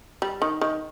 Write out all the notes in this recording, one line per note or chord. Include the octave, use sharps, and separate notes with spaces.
G3
D#3
D#3